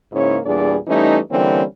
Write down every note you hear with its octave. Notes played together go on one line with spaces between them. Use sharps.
G#2 C#3 A#3 C#4 E4 C#5
E2 A#2 G3 D4 G#4 D5
E3 G3 A3 C#4 D#4
D3 E3 G3 A#3 C4 C#4